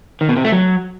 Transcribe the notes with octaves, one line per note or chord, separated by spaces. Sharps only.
D#3
B2
C3
A3
F#3